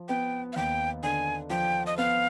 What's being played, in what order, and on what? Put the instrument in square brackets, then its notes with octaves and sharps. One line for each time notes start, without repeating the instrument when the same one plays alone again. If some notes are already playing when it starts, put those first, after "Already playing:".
Already playing: [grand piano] F3
[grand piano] B3 [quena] G5
[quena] F5
[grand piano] D#2 [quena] G5
[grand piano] D3 [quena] G#5
[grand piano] F3 [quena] G5
[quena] D#5
[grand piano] B3 [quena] F5